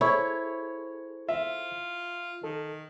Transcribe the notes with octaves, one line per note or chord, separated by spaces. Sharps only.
E4 G#4 A4 C5 C#5 C#6
F4 E5
D#3 A4